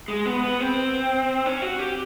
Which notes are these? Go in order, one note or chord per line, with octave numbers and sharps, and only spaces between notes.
G#3
B3
B3
C4
C#4
F#4
G4